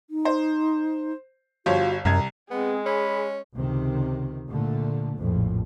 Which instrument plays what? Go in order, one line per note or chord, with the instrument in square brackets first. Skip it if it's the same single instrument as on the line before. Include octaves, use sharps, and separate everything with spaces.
[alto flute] D#4
[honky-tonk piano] C5
[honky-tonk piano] G1 G4 C#5 [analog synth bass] F3 [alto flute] F#4
[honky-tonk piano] C2 G#6 [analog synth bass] F#2 [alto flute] A#5
[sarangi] G#3 [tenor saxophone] B3 [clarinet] C4 [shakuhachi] G#4
[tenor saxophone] C#4 [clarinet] B5
[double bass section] C#2 C3 D#3
A#2 D3 A3
A#1 F2 A2